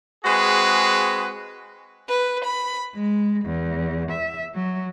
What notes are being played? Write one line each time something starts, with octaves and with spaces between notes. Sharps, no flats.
G#3 C4 F#4 G#4 B4
B4
B5
G#3
E2
E5
F#3